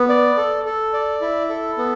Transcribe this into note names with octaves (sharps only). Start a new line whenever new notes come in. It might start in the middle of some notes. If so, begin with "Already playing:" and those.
Already playing: B3
D5
A4
A4
D5
E4
A4
B3